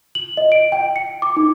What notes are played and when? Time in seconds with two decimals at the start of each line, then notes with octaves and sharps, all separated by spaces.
0.15 F#7
0.37 D#5
0.52 D7
0.72 G5
0.96 C#7
1.22 D6
1.36 D#4